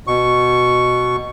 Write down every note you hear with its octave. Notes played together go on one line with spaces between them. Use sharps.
B2 C#6